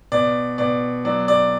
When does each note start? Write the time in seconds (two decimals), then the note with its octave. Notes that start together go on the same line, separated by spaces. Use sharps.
0.12 B2 D5
0.58 B2 D5
1.05 F#3 D5
1.28 D5